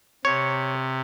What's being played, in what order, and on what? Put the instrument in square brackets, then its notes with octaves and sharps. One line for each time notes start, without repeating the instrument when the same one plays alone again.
[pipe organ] C3 [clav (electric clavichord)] C#5